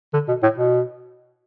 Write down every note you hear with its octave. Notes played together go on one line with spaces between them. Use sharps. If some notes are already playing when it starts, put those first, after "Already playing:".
D3
B2
A2
B2